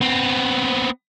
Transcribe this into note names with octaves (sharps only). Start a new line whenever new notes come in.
B3 C4